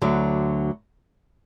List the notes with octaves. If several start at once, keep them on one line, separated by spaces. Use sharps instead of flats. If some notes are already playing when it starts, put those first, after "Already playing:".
D2 D3 F#3